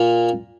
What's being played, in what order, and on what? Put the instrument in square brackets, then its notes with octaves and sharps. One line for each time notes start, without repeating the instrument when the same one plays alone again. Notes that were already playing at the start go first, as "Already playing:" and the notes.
Already playing: [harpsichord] A#2 A#3